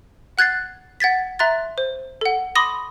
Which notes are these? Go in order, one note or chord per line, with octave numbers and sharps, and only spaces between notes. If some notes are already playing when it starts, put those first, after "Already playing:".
F#5 F#6 G#6 A6 C7
F#5 G#6 A6 B6
E5 A#5 C6 F#6 A6
C5
A4 F#5
B5 C6 D6 D#6 A#6